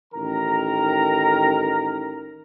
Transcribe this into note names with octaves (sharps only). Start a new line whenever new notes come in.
A1 D#3 A#4 A#5